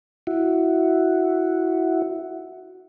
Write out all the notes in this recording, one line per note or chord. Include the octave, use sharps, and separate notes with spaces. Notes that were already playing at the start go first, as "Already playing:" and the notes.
E4 F#4